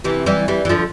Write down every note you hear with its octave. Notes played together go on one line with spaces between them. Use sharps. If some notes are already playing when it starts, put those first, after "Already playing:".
C3 E3
E3 G3
E3 G3
E3
D3 F3